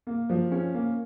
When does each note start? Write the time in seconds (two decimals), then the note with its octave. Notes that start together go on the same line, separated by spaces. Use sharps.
0.07 A#3
0.29 F3
0.52 C#4
0.74 A#3